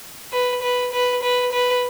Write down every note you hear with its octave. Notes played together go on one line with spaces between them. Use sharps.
B4
B4
B4
B4
B4